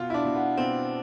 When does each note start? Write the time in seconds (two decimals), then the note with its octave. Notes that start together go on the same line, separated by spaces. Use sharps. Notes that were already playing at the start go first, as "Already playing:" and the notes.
Already playing: B2 F4
0.10 E4
0.14 D4
0.25 B2
0.36 B3
0.57 B2 C4